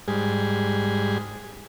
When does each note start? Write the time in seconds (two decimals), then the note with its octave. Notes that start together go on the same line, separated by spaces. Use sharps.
0.08 G#2 G3 G#4